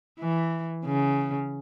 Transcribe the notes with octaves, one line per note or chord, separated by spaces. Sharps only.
E3
C#3